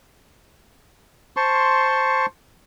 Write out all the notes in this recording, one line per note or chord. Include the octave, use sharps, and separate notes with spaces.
C5 A5 C6 C#6